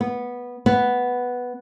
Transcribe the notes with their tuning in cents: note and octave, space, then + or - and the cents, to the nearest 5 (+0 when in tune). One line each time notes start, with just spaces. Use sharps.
B3 -10
B3 +0